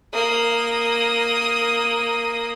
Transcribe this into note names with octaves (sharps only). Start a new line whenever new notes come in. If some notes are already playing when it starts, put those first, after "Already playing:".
A#3 D#6